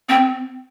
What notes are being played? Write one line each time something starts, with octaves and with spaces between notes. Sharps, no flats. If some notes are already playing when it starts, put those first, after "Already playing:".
C4